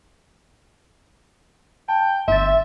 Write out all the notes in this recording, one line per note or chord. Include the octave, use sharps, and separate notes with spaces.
G5 A5
G1 E5 C6 A6